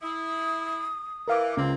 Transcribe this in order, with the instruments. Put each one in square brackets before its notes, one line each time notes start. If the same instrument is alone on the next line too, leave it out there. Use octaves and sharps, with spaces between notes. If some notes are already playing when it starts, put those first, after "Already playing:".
[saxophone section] E4 [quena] D#6
[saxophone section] E3 [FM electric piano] A#4 F5 D6
[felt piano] C#2 [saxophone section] A#3 C4 F4